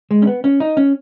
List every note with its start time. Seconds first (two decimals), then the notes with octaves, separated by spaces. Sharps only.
0.11 G#3
0.22 C#4
0.27 B3
0.44 C#4
0.60 D#4
0.77 C#4